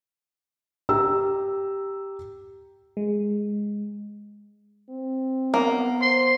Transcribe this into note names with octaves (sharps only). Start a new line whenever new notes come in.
G4 A#5 E6
G#3
C4
A#3 B3
C5 C6